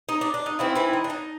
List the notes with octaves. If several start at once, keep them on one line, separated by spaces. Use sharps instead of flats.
D#4
D4
D4
D#4
D#3 E3 C4 E4
E3 E4
D#4
D4
D#4